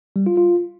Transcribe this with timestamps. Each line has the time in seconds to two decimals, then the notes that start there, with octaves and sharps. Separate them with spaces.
0.16 G3
0.26 F4
0.37 F4